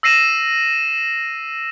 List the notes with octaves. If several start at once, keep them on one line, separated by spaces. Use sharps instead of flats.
E6 A#6 C7 D#7 E7